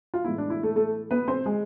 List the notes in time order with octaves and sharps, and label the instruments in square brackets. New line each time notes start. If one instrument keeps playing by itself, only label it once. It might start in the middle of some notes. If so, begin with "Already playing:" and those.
[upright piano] F4
A2 E3 G#3 B3 E4
D4
E4
A3 A4
A3 A4
B3 B4
C4 C5
G#3 G#4